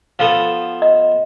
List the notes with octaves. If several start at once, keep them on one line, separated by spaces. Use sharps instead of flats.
F3 B3 A4
D#5